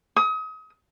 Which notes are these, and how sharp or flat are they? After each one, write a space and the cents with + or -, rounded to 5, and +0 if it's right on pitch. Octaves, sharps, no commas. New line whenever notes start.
D#6 +35